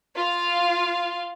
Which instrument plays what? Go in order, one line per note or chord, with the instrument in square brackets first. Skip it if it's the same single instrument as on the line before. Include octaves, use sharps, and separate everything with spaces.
[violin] F4 F5